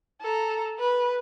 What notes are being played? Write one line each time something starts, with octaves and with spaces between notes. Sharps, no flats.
A4 A#5
B4